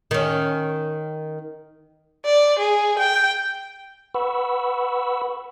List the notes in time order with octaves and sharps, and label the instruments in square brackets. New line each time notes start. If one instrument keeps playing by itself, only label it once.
[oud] D#3 C#4
[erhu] D5
G#4
G5
[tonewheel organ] B4 F#5 B5 C#6 E6